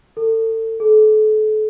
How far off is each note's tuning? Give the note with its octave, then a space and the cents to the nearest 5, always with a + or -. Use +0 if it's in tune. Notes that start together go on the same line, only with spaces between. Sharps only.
A4 +30
A4 -35